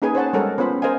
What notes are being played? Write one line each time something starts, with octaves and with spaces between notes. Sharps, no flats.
A#3 C#4 D#4 G#4 B4 G#5
C5 C#5 F#5 A5
G3 G#3 A4 A#4 C#5 F#5
B3 C#4 F4 C5 B5
A#4 C5 D#5 F5 G#5